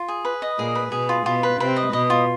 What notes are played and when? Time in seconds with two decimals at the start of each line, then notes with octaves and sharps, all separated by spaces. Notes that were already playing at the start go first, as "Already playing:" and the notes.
Already playing: F4
0.08 G#4
0.25 B4
0.42 D#5
0.59 A#2 A#3 G#4
0.75 B4
0.92 B2 B3 G#4
1.09 F4
1.26 B2 B3 F4
1.43 B4
1.60 C3 C4 B4
1.76 D#5
1.93 B2 B3 D#5
2.10 F4